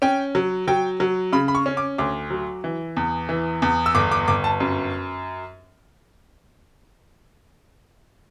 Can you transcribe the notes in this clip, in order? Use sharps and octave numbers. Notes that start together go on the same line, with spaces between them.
C#4 G5
F#3
F#3 G5
F#3
C#3 B5
B5
C#6
C#4
D6
D2 D6
F#3
E3
E2
E3
E2
E6
G1 D6
D6
G1 D6
A5
F#2